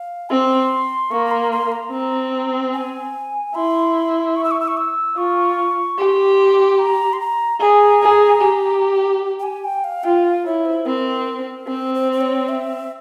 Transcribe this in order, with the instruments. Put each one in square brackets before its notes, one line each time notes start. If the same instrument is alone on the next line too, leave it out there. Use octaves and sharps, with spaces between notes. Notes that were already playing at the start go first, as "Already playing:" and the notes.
Already playing: [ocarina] F5
[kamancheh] C4 [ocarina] C6
[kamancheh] A#3 [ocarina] C#6
[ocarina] A#5
C6
C6
A#5
[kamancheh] C4
[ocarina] G#5
[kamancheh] E4 [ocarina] C6
[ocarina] C#6
E6
C#6
E6
C#6
E6
[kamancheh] F4 [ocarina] C#6
[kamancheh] G4 [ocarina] C6
[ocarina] A#5
C6
A#5
[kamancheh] G#4 [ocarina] A#5
[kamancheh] G#4
G4
[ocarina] G5
G#5
G5
F5
[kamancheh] F4 [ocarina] G5
[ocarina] F5
[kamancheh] E4 [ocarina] C#5
[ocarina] C5
[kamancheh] C4 [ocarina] A#4
[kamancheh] C4 [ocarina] C5
[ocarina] C5
C5
C#5
E5